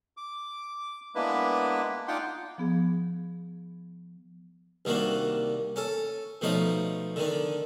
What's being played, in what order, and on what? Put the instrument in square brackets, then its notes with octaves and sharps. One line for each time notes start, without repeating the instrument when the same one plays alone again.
[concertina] D6
G#3 A#3 B3 D4 E4 B4
D4 D#4 F4 F#5 G5 C6
[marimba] F3 B3 G#4
[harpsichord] C2 D#3 A#3 D4 F#4
C#4 A4
B2 F3 A3 D#4 C#5
D3 D#3 D4